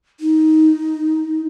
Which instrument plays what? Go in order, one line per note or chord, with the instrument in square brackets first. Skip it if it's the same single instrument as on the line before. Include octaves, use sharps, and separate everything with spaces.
[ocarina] D#4